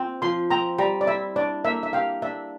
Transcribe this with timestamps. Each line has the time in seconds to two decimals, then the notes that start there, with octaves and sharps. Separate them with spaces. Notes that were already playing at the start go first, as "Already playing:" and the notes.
Already playing: C4 F4
0.22 F3 C6
0.50 C4 A#5
0.78 G3 A#5
1.01 D5
1.07 E4 E5
1.36 D4 D5
1.64 A#3 E5
1.83 E5
1.93 G4 F5
2.22 D4 E5